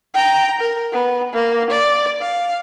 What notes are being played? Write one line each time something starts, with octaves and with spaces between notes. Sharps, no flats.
G5 A#5
A#4
B3
A#3
D5
F5